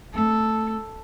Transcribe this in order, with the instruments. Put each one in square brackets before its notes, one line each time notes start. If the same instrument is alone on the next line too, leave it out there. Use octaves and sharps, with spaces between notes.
[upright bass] A3 C4 [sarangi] A4